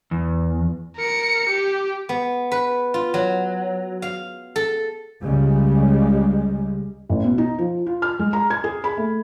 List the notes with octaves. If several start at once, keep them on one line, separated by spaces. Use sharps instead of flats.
E2
A#4 C#7
G4
B3
B4
F4
F#3
F5
A4
C#2 C#3 G3 G#3
A1
B2
D#4
F3
F4
F6
G#3
A#5
G#6
G#4
B5
A3